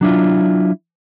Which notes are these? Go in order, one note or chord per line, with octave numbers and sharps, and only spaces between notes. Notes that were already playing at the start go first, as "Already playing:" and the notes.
F#3 D4 E4 F4